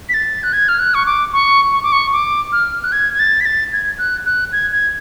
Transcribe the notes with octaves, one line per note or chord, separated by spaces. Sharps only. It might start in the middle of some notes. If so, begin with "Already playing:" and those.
B6
A6
F#6
G#6
F6
F#6
C#6
D6
C#6
C#6
D6
C#6
D6
F6
F#6
G#6
G#6
A6
B6
A6
G#6
F#6
F#6
G#6
G#6